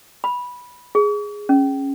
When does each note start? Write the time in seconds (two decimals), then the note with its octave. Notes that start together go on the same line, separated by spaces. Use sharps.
0.24 B5
0.95 G#4
1.49 C#4